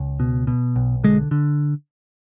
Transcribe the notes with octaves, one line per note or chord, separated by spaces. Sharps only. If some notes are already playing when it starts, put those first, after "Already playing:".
Already playing: C#2
B2
B2
B1
D3 G#3
D3